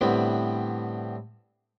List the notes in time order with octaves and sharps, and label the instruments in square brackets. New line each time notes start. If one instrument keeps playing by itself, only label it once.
[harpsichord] A2 D3 G3 B3 C4 E4